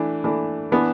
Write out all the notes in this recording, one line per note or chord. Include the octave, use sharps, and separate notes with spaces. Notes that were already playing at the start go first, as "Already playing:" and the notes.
Already playing: E3 A3 D4
E3 A3 D4
E3 B3 D4